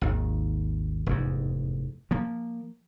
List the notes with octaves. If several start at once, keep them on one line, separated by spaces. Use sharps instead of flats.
G#1 D#2
F1 E2 G#2
F3 A#3